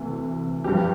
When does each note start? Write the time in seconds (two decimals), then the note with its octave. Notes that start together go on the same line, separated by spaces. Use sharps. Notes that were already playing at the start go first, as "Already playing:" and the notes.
Already playing: D2 C3 E3
0.64 G2 F3 G4